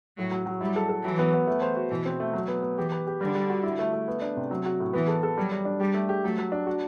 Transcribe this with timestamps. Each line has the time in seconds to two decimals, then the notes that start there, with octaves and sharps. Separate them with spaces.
0.17 A2 F#3
0.31 F#3
0.46 F#3
0.61 G3 E4
0.76 A4
0.89 A4
1.04 E3 F#3
1.19 B3
1.34 B3
1.48 A3
1.62 C5
1.77 F#4
1.90 B2 E3
2.05 C4
2.20 A3
2.33 F#3
2.48 B3
2.62 B3
2.77 E3 G4
2.92 B4
3.07 G4
3.20 D3 G3
3.35 G3
3.49 F#4
3.63 E4
3.79 A3
3.93 A3
4.08 B3
4.22 D4
4.37 C3
4.51 F#3
4.65 F#4
4.80 A2
4.93 E3 B3
5.08 A4
5.23 A4
5.37 F#3 G3
5.52 G3
5.65 D4
5.80 G3 G4
5.94 A3
6.09 G4
6.23 F#3 A3
6.39 F#3
6.52 D4
6.67 F#4